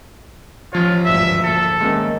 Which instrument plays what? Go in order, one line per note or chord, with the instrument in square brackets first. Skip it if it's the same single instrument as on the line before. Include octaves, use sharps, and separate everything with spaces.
[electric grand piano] A1 F3 C#5 [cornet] F4
[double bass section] G#1 D2 G2 [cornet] E5
[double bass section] D2 A#2 [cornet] A4
[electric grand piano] G#2 A#3 C#4 [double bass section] D#3 A3